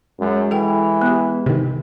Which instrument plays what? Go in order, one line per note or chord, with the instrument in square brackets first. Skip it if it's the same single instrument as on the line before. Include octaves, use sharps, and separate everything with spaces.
[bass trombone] F#2 [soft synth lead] G#3
[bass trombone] E3 [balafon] A4 G5
[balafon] B3 G4
[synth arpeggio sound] C3 D#3